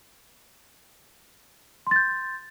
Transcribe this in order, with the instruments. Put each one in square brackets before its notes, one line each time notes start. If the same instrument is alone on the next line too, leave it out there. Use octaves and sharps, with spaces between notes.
[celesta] C6
A6
G6